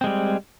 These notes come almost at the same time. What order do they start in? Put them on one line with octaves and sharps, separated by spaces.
C4 G#3 G3